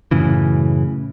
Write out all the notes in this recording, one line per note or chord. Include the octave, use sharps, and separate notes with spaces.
F#2 A2 C#3 E3